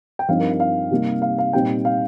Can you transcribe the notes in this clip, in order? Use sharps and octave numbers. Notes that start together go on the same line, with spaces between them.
G5
G2 F3 C4 D#4 F5
A#4
F5
F5
C3 G3 A#3 D#4
F5
F5
A#2 G3 C4 D#4 G5
F5